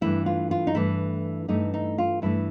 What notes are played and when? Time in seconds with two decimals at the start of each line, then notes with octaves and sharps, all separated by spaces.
0.01 G2 E3 A3 E4
0.26 F4
0.51 F4
0.67 D#4
0.75 G2 E3 A3 E4
1.48 G2 E3 A3 D#4
1.74 D#4
1.98 F4
2.22 G2 E3 A3 E4